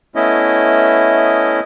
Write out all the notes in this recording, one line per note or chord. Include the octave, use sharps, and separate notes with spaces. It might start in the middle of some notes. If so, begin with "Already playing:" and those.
A3 B3 C#4 E4 D#5